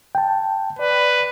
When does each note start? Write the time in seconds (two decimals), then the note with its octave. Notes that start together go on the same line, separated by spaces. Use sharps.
0.15 G5 A5
0.79 B4 D5